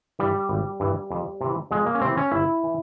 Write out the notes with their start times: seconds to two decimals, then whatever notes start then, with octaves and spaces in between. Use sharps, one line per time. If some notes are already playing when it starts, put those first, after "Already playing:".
0.19 G2 E3 G3
0.49 G#1
0.80 G2 E3
1.11 F2
1.41 C3 E3
1.71 F2 G#3
1.86 A#3
1.95 C#4
2.01 C3 E3 C4
2.17 C#4
2.31 G1 E4
2.64 E3